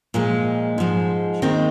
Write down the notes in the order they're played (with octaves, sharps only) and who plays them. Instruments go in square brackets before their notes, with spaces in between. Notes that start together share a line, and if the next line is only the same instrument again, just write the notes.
[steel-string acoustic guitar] A#2 F3 G#3
G#2 F3 G#3
D#2 D#3 G#3 C4